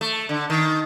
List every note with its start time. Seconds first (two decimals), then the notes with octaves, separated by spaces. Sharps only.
0.01 A3
0.29 D3
0.50 D#3